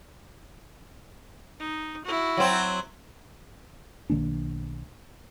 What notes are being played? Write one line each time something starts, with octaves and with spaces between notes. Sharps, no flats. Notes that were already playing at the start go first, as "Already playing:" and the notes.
D#4
E4 F#4
F#3 C4
B1 D#3 A#3 D4